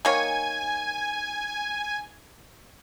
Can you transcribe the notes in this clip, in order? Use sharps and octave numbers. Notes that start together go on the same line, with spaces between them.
D#3 A#3 C#5 G#5